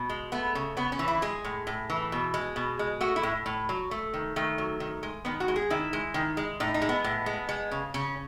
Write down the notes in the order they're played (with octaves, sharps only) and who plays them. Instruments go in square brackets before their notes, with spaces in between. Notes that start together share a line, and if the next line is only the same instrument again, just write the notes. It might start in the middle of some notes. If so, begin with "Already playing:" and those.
Already playing: [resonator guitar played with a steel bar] B2
G#3
A3 B3
C#3
C#3 B3
C#4
E3
E4
G#3 G#4
A2
A2
E3
B2
G#3
B2
G#3
A3 F#4
E4
A2
A2
F#3
A3
D#3
D#3 A3
F#3
D#3
G#3
D#3 B3
F#4
G#3
G#4
D#3 E4
G#3
D#3
G#3
A2 D#4
D#4
G#3
B3
A2
G#3
G#3
C#3
C#3 C#4